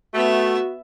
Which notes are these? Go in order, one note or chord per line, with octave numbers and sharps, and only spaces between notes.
A3 B3 F#4 E5